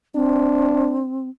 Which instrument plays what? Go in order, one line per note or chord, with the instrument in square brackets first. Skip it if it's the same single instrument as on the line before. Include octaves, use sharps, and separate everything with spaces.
[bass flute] C4 [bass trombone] D4